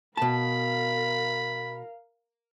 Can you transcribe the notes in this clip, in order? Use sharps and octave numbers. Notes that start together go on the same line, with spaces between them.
B2 A#4 F5 A5 B5